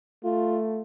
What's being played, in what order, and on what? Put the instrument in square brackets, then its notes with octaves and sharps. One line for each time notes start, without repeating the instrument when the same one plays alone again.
[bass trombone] A3 [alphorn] F4